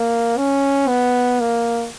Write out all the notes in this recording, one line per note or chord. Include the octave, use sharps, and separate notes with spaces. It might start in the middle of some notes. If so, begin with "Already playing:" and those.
Already playing: A#3
C#4
B3
A#3